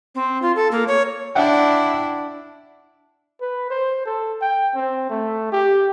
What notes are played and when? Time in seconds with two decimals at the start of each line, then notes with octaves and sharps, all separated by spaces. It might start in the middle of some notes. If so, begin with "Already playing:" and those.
0.15 C4
0.42 F4
0.56 A4
0.72 A#3
0.88 C#5
1.35 D4 E4 E5 F#5 G5
3.41 B4
3.70 C5
4.06 A4
4.42 G5
4.75 C4
5.10 A3
5.52 G4